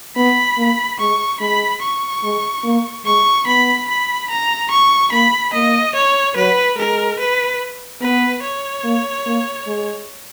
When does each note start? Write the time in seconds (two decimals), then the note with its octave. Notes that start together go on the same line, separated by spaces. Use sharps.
0.16 B3 B5
0.57 A#3
0.99 G#3 C#6
1.40 G#3 B5
1.82 C#6
2.23 G#3
2.64 A#3
3.06 G#3 C#6
3.46 B3 B5
3.89 B5
4.30 A#5
4.71 C#6
5.12 A#3 B5
5.53 A#3 D#5
5.95 C#5
6.36 F#3 B4
6.77 G#3 A#4
7.19 B4
8.01 B3 B4
8.43 C#5
8.84 A#3
9.26 A#3
9.67 G#3